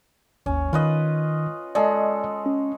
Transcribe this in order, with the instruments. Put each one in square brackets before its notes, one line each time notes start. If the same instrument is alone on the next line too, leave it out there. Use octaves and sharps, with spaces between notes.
[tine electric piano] G#1 D#2 [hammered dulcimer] C#4
[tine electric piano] D#3 [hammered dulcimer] F4 B4 D#5
[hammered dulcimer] G#3 A4 [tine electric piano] D5 D#5
[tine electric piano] C#4